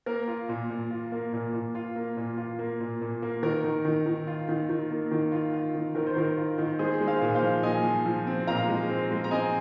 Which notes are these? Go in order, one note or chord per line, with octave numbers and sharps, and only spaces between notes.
A#3 A#4
F4
A#2
A#2
F4
A#3
A#2
A#2
F4
A#3
A#2
F4
A#3
A#2
A#2
A#3
D#3 A#4
D#3
D#3
D#3
F4
D#3
D#3
A#3
D#3
F4
F4
D#3
D#3 A#4
C5
D#3 A#4
F4
D#3
G#3 G#4 C5
G#3
C5 F5
A#2
C5 F5
F3
A#2 D#5 G#5
F3
F3
C4
A#2 F5 A#5
G#3
C4
G#3
A#5
C4 D#5 G#5